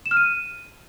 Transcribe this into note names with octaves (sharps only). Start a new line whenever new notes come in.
E7
F6
D#7